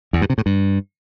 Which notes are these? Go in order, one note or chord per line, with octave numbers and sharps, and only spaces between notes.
E2
G2
C3
A2
G2